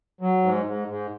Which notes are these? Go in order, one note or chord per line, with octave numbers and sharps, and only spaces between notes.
F#3
G#2
G#2
G#2